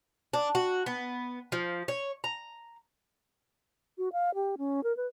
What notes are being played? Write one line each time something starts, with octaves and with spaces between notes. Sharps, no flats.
D4
F#4
B3
F3
C#5
A#5
F#4
F5
G4
C#4
A#4
B4